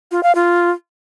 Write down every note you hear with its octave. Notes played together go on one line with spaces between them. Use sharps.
F4
F5
F4